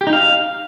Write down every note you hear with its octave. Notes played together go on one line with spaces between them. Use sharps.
G4
D#4
F5